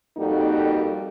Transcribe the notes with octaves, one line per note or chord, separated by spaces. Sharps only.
F2 G3 A#3 D#4 F#4 A4